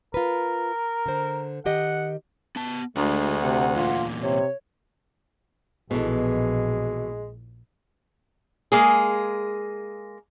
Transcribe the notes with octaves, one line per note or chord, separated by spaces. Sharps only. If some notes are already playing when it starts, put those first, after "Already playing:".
F4 A#4 B4
D3 C5
D#3 G4 D#5 F#5
B3 A5
D2 G#3 D4 F#4
C3 F#5
E2 A#2 F4
C3 C#5
A#1 B2 E3 G#3 A4
G#3 A#3 G#4